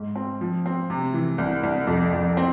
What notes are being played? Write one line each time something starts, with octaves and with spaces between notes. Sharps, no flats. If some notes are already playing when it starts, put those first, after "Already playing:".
Already playing: G#2
C4
F3
C4
C3
E3
C2
C2
F2
F2
C4